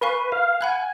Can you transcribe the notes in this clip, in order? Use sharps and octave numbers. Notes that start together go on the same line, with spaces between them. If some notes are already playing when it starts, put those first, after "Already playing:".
A#4 B4 F5 G#5 C#6
F5
F#5 G#5 B5 F#6